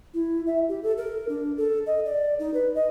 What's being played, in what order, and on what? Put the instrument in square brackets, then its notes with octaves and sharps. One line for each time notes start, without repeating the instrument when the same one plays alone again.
[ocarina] E4
E5
G4
A4
A#4
D4
A4
D#5
D5
D#4
B4
D#5